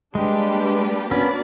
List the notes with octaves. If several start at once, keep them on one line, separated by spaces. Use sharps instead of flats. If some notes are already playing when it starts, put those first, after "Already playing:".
G3 G#3 A#3 D4 G4 B4
A#3 B3 C#4 D4 F#4 A#4 D5